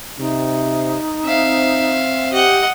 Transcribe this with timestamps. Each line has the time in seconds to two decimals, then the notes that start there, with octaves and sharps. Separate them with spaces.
0.19 C3 D#4
1.24 C4 E5 F5
2.32 G4 D#5 F#5